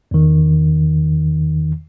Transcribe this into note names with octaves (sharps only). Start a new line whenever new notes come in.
E2 D#3